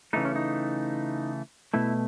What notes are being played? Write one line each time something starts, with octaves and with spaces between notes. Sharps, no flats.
C#3 E3 A3 D#4
C#4
D#4
B2 A3 E4